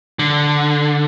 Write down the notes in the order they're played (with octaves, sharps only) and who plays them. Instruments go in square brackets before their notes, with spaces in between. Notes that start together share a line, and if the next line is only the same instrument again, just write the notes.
[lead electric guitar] D3